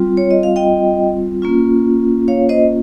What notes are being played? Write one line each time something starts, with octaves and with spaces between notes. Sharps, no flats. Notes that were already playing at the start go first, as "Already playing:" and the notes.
Already playing: G3 C4 F4
C#5
D#5
F5
D#5 G5
A#3 C#4 F4
C#5 F5
C5 D#5